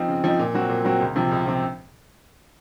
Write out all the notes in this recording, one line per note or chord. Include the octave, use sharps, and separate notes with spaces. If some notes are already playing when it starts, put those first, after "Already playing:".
Already playing: F3 C4 D#4
C#3
F3 C4 D#4
A#2
F#3 C4 F#4
A#2
F#3 C4 F#4
C#2
C3 F3 C4
C#2
C3 F3 C4